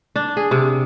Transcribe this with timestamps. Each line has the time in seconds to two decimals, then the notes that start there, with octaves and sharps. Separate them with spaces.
0.16 D4
0.37 G#4
0.51 C3